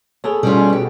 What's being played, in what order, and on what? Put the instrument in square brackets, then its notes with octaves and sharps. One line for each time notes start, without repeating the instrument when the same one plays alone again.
[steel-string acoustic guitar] B3 [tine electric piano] G#4 A4 C#5
[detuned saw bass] B2 [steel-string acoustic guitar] G3 C#4 F4
[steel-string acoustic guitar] G4